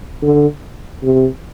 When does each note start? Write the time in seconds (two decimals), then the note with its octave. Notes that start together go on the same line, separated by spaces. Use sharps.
0.22 D3
1.03 C3